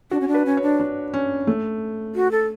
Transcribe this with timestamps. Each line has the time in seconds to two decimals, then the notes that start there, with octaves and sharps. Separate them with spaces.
0.11 D4 F#4
0.20 C#4
0.28 D4
0.34 B4
0.46 C#4
0.57 D4 C#5
0.80 D4
1.14 C#4
1.47 A3
2.15 F#4
2.31 A4